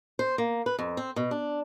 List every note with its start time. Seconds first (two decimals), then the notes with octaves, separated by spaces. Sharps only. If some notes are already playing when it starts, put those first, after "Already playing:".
0.19 C5
0.38 A#3
0.66 B4
0.79 F2
0.97 C4
1.16 B2
1.31 D4